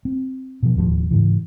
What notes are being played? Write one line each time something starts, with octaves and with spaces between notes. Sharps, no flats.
C4
B2 F3
D1 D#2 D3 F3
G#2 C#3 E3